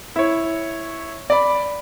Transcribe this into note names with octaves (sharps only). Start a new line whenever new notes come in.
E4 C#5
D5 B5